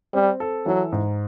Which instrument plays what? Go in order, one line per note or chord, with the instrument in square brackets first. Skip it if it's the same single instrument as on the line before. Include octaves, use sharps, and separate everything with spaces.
[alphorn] G3 [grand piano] C4
[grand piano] A4
[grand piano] E3 [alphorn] F#3
[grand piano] G#2